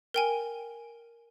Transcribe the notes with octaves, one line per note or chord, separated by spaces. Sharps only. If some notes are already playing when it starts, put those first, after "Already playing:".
A#4 G5 G#5